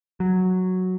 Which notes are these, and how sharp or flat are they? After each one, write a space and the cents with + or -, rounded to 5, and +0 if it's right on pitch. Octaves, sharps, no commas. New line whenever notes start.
F#3 -5